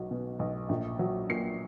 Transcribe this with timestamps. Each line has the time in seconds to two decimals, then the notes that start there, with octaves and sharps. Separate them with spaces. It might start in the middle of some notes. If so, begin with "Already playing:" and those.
Already playing: B1 F#3
0.11 B2
0.39 B1
0.69 A#1
0.99 F#3
1.30 A#2 C7